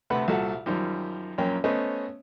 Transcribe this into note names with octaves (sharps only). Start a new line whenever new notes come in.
D2 C3 A3 B4 F#5 B5
C2 A#2 F#4 A4 E5 F#5
F#2 D#3 F3 G3
A#1 F#2 A#3 C#4 G5
A3 B3 C#4 C5 C#5 D#5